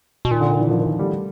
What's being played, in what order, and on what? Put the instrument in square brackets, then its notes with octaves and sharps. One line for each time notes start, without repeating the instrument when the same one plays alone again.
[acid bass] B2
[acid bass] A#2 [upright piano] D#3
[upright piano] D3
D#3
D3 E3
D#3 F3
D#3
G3 A3